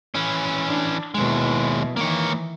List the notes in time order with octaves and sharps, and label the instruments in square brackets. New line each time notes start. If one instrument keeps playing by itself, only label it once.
[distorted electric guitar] E3 C#4
[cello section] D4
[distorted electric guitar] D#2 G#3 [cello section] B2 E4
[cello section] D#3 E3 [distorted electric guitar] A#3 C#5